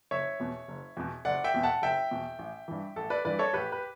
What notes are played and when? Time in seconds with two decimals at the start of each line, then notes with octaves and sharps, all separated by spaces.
0.11 F#1 C#5 E5
0.40 E2 B2
0.68 F#1
0.97 E2 B2
1.25 F#1 D5 F#5
1.44 E5 G5
1.54 E2 B2
1.63 F#5 A5
1.82 F#1 E5 G5
2.11 E2 B2
2.39 A1
2.68 G2 E3
2.96 A1 A4
3.10 B4 D5
3.25 G2 E3 B4 D5
3.39 A4 C#5
3.53 A1 G4 B4
3.72 B4